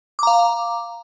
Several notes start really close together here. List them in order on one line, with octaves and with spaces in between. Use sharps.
D6 A#5 F5